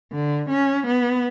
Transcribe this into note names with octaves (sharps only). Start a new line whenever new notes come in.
D3
C#4
B3